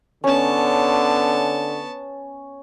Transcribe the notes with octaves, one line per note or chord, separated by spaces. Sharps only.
D3 B3 C#4 A5